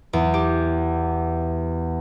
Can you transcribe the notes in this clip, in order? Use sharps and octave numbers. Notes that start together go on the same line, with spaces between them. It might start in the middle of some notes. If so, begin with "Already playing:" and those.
E2
G4